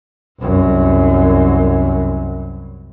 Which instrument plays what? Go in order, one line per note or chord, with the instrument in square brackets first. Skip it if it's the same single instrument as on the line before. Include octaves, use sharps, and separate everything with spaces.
[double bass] C2 F#2